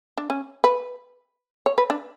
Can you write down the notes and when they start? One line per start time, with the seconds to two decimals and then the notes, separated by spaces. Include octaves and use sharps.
0.18 D4
0.30 C#4
0.64 B4
1.66 C#5
1.78 B4
1.90 D4